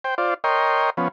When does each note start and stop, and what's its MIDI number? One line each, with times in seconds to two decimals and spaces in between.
0.04 0.15 72
0.04 0.15 79
0.18 0.34 65
0.18 0.34 72
0.18 0.34 74
0.44 0.90 70
0.44 0.90 73
0.44 0.90 75
0.44 0.90 79
0.44 0.90 84
0.97 1.08 53
0.97 1.08 59
0.97 1.08 61